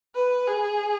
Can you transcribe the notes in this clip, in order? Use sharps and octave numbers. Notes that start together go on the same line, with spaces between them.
B4
G#4